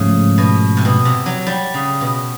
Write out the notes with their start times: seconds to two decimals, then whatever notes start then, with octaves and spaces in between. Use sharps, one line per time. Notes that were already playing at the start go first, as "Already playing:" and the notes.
Already playing: G#2 C#3 F3 A3 C#4
0.38 B2
0.77 C3
0.85 B2
1.05 C3
1.26 F#3
1.46 G3
1.74 C#3
2.01 B2